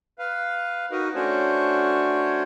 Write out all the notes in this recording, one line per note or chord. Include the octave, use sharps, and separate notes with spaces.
B4 F5
D#4 F#4 A#4 B4 D#5
A3 C#4 D4 F#4 C5 C#5